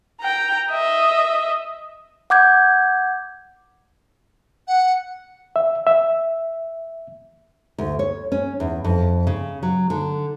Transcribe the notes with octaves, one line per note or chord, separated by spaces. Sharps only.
G5 A#5
D#5 E5
F#5 D6 G6 G#6
F#5
E5
E5
D2
C#5
C#4
E2
F2
C#3
F#3
D3